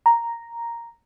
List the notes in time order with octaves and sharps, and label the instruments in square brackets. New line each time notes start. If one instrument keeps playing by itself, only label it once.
[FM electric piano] A#5